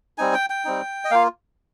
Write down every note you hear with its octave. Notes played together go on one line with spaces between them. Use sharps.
G3 C4 D#4 G#5
G5
G5
G3 C4 D#4
D#5
A#3 F4 F5